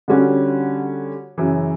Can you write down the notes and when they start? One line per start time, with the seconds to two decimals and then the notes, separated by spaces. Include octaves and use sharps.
0.08 D3 G3 C#4 F#4
1.38 F#2 C#3 E3